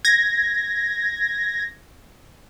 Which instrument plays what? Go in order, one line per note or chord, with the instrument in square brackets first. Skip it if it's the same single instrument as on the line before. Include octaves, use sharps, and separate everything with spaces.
[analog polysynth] G#6 A#6